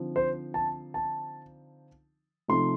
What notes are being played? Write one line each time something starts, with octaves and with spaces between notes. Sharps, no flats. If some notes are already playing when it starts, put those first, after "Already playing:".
Already playing: D3 F3 C4 D#4
C5
A5
A5
C3 F3 A3 D#4 C6